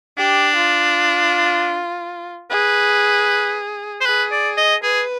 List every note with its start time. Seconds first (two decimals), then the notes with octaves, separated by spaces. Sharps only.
0.18 D4 G4
0.56 F4
2.51 G#4 B4
4.01 C5
4.06 G#4 B4
4.32 D5
4.57 D#5
4.83 G#4 B4